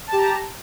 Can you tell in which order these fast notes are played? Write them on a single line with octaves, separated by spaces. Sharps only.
A5 G4 A#5